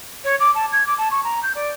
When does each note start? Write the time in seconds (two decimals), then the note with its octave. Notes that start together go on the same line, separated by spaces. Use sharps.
0.24 C#5
0.40 D6
0.55 A5
0.72 G#6
0.87 D6
0.98 A5
1.11 C#6
1.24 A#5
1.43 G6
1.55 D5